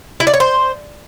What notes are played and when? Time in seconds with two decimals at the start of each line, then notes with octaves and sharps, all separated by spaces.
0.20 E4
0.27 D5
0.34 C#5
0.40 C5